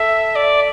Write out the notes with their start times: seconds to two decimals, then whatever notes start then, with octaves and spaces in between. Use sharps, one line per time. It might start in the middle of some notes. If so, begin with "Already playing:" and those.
Already playing: A4 E5
0.35 D5